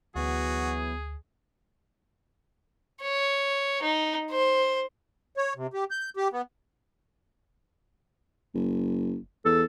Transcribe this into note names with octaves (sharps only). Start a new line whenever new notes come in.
D2 E3 F#3 B3 F#4 G#4
C#5
D#4
C5
C#5
C3
G4
G6
G4
B3
F#1
E2 A4